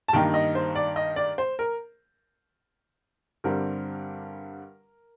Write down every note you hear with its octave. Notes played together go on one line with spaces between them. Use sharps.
A5
G2 D#3 A#3 D#4 G5
D#5
C5
D5
D#5
D5
C5
A#4
G2 D3 G3 C4 A#4